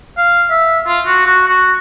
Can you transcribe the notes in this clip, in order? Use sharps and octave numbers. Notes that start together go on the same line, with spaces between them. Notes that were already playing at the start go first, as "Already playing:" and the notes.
F5
E5
F4
F#4
F#4
F#4